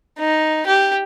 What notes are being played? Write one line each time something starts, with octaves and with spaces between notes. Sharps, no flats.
D#4
G4